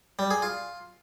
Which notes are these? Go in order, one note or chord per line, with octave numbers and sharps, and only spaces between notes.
G3
G#4
F4